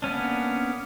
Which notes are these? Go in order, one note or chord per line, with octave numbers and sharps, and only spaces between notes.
A#3 B3 C#4 D4